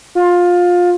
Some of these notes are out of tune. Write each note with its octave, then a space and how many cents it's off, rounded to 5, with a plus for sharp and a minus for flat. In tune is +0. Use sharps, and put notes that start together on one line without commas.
F4 +20